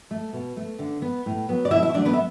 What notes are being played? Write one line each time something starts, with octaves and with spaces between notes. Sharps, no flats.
A3
B2
A3
D3
B3
A2
F#3 B3
D5
B2 E4 E5
E4 E5
F#3 A3 D4 D5
B3 B4
E5